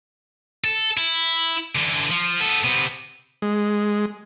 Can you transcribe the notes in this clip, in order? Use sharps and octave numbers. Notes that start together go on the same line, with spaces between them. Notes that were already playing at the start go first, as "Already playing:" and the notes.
A4
E4
D3 E3
F3
B3 A4
C3 B3
G#3